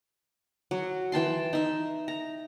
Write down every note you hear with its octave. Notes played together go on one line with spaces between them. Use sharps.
F#3
E3 G5 A5 C6
D#4 E5
A#5